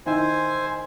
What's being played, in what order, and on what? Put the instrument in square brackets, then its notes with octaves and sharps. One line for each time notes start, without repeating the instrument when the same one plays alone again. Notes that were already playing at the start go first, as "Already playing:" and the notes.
[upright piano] D#3 E4 [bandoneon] C5 G#5